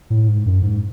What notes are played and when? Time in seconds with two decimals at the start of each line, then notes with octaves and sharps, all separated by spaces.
0.10 A2
0.28 G#2
0.46 F#2
0.62 G#2